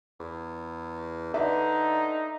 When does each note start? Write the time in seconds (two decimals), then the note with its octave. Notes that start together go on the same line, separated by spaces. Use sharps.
0.20 E2
1.34 D3 D#4 B4 D5 E5